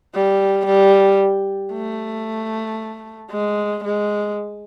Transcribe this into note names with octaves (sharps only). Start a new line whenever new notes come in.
G3
G3
A3
G#3
G#3